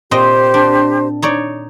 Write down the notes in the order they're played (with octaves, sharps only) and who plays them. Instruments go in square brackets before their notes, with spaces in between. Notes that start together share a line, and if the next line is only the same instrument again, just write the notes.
[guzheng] A#2 C4 D#5 [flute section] G4 C5
[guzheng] D4
D#4 C#5 D5